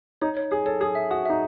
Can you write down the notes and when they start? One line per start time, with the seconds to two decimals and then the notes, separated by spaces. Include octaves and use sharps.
0.21 D#4 C#5
0.37 C#5
0.51 G#4 C#5
0.66 A4 C#5
0.81 G#4 D#6
0.95 E5
1.11 F#4 D#6
1.25 D#4 E5